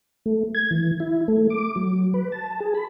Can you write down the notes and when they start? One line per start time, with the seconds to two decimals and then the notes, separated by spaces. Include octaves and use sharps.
0.26 A3
0.55 G#6
0.71 E3
1.00 E4
1.28 A3
1.50 D6
1.76 F#3
2.14 B4
2.32 A5
2.60 G#4
2.74 B5